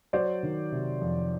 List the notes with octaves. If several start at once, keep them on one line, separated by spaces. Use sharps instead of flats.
F#3 C5 D5
D#3
C3
F2